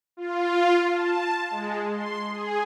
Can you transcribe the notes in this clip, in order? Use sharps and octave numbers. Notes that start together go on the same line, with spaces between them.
F4
A5
G#3
C6
G#4